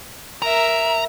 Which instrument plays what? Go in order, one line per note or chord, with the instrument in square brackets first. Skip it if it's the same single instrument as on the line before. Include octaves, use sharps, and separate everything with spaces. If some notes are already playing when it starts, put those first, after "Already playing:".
[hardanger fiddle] A#4 E5 [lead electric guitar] A#5